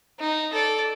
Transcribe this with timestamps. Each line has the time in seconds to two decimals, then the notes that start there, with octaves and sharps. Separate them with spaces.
0.20 D#4
0.53 A4 D5